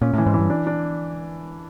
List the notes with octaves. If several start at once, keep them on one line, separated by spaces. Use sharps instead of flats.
A#2 C#4
A2
E3
G#2
G2 E3
D4
D4